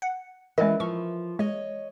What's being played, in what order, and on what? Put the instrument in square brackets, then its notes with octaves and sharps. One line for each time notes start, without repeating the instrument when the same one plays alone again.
[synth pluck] F#5
[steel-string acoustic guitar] E3 [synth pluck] G#3 C#4 D#5 [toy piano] A#4 E5
[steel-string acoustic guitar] F3 [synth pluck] C#6
[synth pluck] G#3 [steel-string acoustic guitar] C#5 D#5